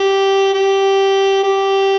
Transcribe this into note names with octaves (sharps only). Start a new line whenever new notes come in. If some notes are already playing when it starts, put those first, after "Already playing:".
Already playing: G4
G4
G4